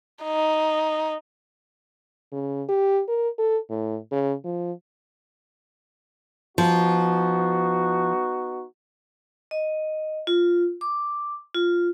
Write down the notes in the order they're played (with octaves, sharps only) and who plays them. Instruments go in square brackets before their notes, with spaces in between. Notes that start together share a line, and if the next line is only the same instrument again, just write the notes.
[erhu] D#4
[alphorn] C#3
G4
A#4
A4
A2
C#3
F3
[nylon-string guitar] F3 [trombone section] B3 D#4 F#4
[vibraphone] D#5
F4
D6
F4